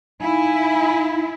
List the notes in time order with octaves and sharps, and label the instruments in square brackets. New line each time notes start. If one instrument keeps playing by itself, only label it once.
[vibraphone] D#4 F5 [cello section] E4 [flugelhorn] G#5